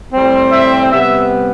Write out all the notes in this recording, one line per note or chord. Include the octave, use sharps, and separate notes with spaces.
A2 G3 C4
E5
C3 G3 B3 E5